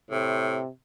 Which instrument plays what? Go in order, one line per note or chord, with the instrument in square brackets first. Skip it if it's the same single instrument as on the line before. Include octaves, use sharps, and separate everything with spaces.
[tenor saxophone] A2 [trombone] C3